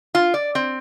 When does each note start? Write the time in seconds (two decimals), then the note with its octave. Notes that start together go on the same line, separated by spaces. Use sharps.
0.15 F4
0.34 D5
0.55 C4